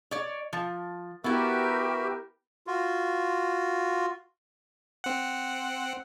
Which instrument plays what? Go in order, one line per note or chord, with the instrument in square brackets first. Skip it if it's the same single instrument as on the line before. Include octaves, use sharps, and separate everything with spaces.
[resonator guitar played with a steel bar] C#5 D5
F3
[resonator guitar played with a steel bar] B3 E4 [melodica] F#4 B4 E5 [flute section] G4 A#4
[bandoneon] F4 F#4
[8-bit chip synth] C4 F#5